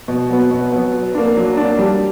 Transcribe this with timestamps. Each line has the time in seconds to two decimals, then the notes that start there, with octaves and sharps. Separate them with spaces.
0.08 B2
0.30 F#3 B3
0.51 B2
0.72 F#3 B3
0.93 F#3
1.15 A#3 D4
1.36 F#3
1.57 A#3 D4
1.79 G3